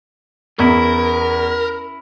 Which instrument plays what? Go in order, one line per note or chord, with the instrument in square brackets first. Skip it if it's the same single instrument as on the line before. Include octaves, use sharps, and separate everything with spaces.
[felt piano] E2 [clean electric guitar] C#4 E4 [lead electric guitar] A#4